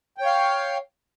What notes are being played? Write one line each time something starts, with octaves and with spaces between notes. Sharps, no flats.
C#5 F5 G5